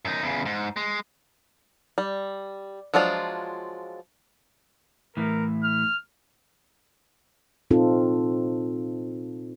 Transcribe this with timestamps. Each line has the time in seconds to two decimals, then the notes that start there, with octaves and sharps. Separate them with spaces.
0.05 F#2 D#4
0.23 E2 C#3
0.46 G#2
0.76 G#3
1.98 G3
2.94 F3 F#3 G#3 D4 F4
5.17 A2 E3 A#4
5.64 F6
7.71 A#2 C4 D#4 F4 A4